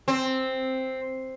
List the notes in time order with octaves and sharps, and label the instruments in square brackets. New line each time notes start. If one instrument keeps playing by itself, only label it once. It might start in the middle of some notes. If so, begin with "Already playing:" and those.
[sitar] C4